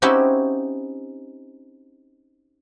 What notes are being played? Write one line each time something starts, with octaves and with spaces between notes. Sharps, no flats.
C4 C#4 D#4 E4 F#4 G4